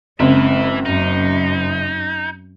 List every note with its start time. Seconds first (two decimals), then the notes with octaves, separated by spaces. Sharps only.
0.20 F#1 E3 G#3 C4 E4
0.86 F#2 D#4